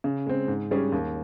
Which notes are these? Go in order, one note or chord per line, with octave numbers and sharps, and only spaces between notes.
C#3
G#3 C4
G#2
G3 C#4 G#4
D#2